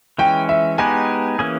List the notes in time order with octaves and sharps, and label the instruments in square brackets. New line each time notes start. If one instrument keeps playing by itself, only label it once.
[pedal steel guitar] E3 G#3 C#4 [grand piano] G5
[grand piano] E5
[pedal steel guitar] G#3 B3 D#4 G4 B4 [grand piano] G#5
[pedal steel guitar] E3 A#3 C#4 G#4